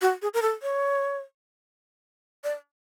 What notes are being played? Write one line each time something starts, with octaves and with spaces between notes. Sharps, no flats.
F#4
G#4
A#4
A4
C#5
D5